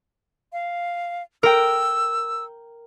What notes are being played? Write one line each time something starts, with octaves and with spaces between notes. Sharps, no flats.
F5
A#4 G5 E6